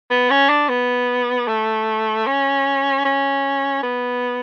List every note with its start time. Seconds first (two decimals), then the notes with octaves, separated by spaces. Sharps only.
0.10 B3
0.30 C#4
0.49 D4
0.69 B3
1.48 A3
2.26 C#4
3.05 C#4
3.83 B3